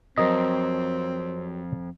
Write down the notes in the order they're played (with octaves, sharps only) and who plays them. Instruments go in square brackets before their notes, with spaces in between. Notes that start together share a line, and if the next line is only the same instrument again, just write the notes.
[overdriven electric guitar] F2 [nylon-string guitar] F#3 A#4 [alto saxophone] C4 [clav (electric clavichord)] D#5